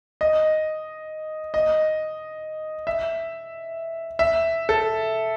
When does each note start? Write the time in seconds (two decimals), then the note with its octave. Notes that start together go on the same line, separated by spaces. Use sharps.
0.21 D#5
1.54 D#5
2.87 E5
4.19 E5
4.69 A4